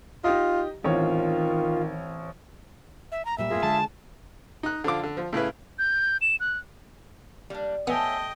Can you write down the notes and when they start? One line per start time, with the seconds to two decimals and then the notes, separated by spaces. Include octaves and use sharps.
0.24 D#4 F4 G4 D#5
0.84 A1 D#3 C4 F4 C#5
3.12 E5
3.25 A#5
3.38 A#2 G3 E5
3.50 A2 B3 F4 G#4 A#4
3.63 D3 G#3 A5
4.63 D#4 F#6
4.84 D3 F3 F4 D6
5.03 D3
5.17 F3
5.33 A2 C#3 E4 B4
5.79 G6
6.21 E7
6.40 F#6
7.50 G3 A#3 D4
7.87 A3 B3 C#5 D#5 E5 G5 G#5